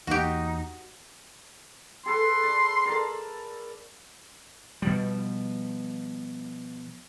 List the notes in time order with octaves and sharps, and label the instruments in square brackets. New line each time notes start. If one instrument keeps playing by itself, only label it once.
[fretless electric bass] E2 A#3 [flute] D#4 [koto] F#4 G4
[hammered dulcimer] G#4 A4 B4 [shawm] C6
[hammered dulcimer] D5
A#4 D5 A5
[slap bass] B2 F3 G3